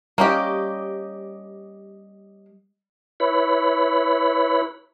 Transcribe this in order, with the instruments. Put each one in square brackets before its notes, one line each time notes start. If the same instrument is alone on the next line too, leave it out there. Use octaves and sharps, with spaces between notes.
[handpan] G3 D#5 [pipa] A#3 C#4 G4
[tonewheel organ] E4 B4 C#5 B5